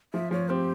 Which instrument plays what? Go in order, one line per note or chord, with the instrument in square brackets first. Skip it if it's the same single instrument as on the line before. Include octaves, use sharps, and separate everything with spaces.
[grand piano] F3 [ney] E5
[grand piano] F3 [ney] C#5
[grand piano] C4 [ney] G4